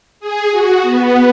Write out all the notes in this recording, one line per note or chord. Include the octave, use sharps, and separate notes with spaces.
G#4
F#4
B3